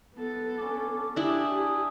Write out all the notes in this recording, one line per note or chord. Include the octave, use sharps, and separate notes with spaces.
B3 A4
C#4 D4 D6
D4 E4 G4 G#4 D#6